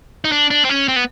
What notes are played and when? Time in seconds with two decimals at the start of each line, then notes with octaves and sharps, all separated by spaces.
0.24 D#4
0.32 D4
0.51 D4
0.65 C4
0.69 C#4
0.88 C4
0.96 B3